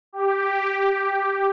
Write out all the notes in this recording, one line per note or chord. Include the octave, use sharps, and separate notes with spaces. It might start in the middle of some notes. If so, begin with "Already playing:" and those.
G4